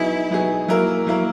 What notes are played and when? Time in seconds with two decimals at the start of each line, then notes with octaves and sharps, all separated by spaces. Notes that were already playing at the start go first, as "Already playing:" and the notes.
Already playing: F#3 B3 D#4 E4 G#4
0.31 F#3 B3 D#4 G#4
0.68 F#3 A#3 E4 A#4
1.07 F#3 A#3 E4 A#4